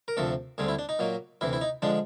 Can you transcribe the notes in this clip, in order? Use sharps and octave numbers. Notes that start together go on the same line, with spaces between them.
A#4
D2 C3 F3 A4
D2 D3 G3 C4 G#4
E4
D4
D#4
A#2 F#3 A#3
D2 C3 E3 E4
E4
D#4
D3 F3 G#3 D4